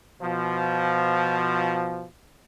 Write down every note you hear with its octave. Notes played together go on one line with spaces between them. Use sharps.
B2 F3